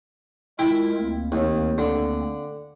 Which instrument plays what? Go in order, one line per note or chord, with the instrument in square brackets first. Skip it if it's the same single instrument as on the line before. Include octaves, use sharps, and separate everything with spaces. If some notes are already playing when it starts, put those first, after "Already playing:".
[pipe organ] G#3 F4 A#4 [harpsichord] E4 G5
[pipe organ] D2 A#3 C4
[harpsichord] D#2
D3